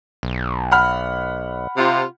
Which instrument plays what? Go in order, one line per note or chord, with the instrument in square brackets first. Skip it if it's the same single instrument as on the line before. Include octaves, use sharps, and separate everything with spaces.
[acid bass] B1
[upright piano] F#5 B5 F6
[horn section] C3 F4